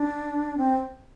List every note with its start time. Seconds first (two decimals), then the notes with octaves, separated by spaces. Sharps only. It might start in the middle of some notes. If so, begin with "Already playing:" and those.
Already playing: D4
0.58 C4